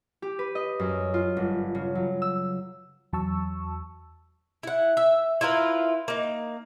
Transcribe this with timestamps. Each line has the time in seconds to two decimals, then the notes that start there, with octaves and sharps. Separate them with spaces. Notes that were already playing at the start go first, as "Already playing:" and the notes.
0.22 G4
0.39 B4
0.55 D#5
0.80 F#2
1.14 F4
1.37 G1
1.75 C#3
1.95 F#3
2.22 E6
3.13 E2 F#3 A5 C#6 E6
4.63 E4 F#5
4.97 E5
5.41 E4 F4 A#4 B4
6.08 A#3 D#4